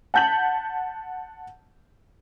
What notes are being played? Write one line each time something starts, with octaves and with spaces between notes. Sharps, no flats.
F#5 A5 G6 B6 F#7